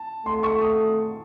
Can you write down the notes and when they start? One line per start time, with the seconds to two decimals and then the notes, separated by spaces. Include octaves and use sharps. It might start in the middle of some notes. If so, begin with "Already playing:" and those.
Already playing: A5
0.26 A3 C6
0.43 C#6
0.61 D#6